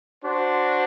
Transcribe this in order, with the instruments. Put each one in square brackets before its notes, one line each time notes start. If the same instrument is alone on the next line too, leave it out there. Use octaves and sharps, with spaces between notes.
[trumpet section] D4 F#4 C5